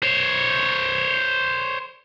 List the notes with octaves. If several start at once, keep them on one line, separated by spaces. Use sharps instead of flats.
C5 C#5